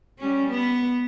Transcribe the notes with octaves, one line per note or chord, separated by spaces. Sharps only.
G3 C#4
B3